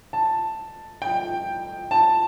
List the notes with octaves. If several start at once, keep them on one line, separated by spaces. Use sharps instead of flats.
A5
G5
A5